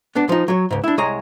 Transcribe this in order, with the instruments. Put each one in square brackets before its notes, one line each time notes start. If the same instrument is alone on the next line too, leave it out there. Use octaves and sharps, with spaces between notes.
[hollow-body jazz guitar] B3 D4
F3 D#4
F#3 C#5
C#2 G#2
D4 E4
C2 G#3 C#5 D#5 A#5